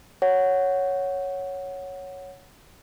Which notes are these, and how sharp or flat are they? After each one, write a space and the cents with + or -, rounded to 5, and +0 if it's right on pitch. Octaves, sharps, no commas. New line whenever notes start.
C#5 +0 F#5 +0